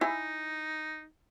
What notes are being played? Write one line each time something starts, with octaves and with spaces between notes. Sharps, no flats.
D#4 E4 G#5